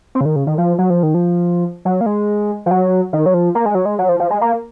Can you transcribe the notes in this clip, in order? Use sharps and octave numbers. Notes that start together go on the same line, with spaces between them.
C4
C#3
D#3
C#3
D#3
F3
F#3
F3
D#3
F3
F#3
A#3
G#3
F3
F#3
D#3
F#3
F3
A#3
G#3
F#3
G#3
F#3
F3
F3
G#3
A#3